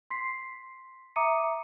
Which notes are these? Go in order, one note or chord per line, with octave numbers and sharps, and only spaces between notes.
C6 B6 C7
E5 A#5 D6 D#6 C#7 D#7